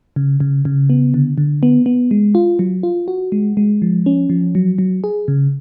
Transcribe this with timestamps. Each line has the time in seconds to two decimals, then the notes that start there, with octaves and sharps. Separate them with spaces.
0.16 C#3
0.40 C#3
0.65 C#3
0.90 B3
1.14 D3
1.38 D3
1.63 B3
1.86 B3
2.11 G#3
2.35 F4
2.59 F#3
2.83 F4
3.08 F#4
3.32 G#3
3.57 G#3
3.82 F3
4.06 C#4
4.30 F3
4.55 F#3
4.78 F#3
5.04 G#4
5.28 C#3